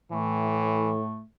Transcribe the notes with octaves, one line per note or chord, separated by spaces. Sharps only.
A2 E3 A3